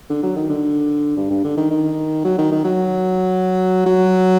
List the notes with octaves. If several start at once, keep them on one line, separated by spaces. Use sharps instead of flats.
D3
F#3
D#3
D3
G2
G2
D3
D#3
D#3
F#3
D#3
D#3
F#3
F#3